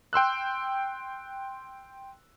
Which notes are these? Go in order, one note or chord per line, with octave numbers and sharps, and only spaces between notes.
G5 C6 E6 F#6